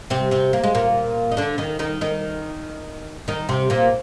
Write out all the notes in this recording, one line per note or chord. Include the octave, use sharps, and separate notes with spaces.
C3 C4
C3 C4
A#3
G#3
A#2 A#3
D#4
D3 D4
D#3 D#4
D#3 D#4
D#3 D#4
D#3 D#4
C3 C4
A#2 A#3